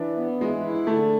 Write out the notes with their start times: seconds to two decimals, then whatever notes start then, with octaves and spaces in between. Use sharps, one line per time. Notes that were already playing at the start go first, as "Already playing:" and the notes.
Already playing: E3 D4
0.17 B3
0.40 E3 G#3
0.64 E4
0.87 D3 A3